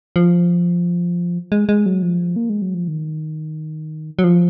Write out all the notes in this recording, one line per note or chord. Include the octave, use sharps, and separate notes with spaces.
F3
G#3
G#3
F#3
F3
A#3
G#3
F#3
F3
D#3
F#3
F3